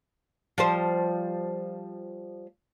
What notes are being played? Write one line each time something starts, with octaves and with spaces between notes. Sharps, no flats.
F3 G3 C5